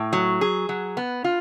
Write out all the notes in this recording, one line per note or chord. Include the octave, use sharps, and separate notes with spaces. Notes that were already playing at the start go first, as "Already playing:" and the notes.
Already playing: A2
F#3
G#4
F#3
B3
F4